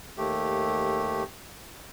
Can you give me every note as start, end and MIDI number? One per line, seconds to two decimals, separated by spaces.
0.18 1.23 39
0.18 1.23 57
0.18 1.23 67